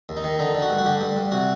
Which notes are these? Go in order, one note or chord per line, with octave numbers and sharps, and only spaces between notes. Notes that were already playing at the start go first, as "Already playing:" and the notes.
D#2
D#4
D#3
D3 D#4
D3
F#4
G2
F#4
D3 G4
G2
G2
C3 F#4